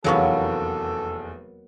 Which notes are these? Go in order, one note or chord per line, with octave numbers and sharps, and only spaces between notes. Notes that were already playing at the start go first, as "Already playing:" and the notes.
F1 E2 F#3 A#3 B3 A4 C#6